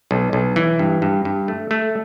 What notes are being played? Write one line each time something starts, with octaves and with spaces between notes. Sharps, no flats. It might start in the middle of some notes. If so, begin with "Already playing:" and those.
B1
B1
E3
G2
G2
G2
A3
A3